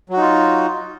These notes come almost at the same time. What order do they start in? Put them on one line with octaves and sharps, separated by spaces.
F#3 F#4 D#4 F4